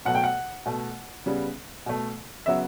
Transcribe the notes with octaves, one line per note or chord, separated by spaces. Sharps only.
B2 F#3 A3 F#5
G5
F#5
B2 A3
C#3 G3 B3
B2 A3
C#3 F#3 B3 E5